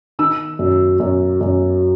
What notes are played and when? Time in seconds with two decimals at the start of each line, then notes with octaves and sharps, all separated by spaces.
0.19 D#3 E6
0.59 F#2
1.00 F#2
1.41 F#2